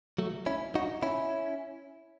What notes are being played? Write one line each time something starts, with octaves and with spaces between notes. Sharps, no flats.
F#3 A3
C#4 E4
D#4 F#4
C#4 E4